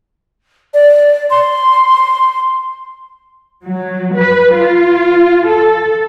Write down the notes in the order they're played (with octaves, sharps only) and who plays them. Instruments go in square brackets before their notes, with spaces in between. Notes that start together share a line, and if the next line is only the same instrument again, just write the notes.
[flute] D5
C6
[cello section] F#3
B4
F4
A4